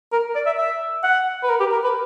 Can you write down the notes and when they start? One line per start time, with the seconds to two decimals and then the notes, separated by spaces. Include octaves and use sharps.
0.12 A#4
0.35 D5
0.46 E5
0.58 E5
1.03 F#5
1.43 B4
1.50 A#4
1.60 G4
1.72 A#4
1.84 B4